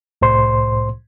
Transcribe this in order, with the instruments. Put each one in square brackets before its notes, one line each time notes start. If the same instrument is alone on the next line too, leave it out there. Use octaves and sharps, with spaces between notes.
[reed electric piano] C2 A2 C5 C6